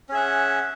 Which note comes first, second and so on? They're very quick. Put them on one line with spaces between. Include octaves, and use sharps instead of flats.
C#4 G#4 E5 F#5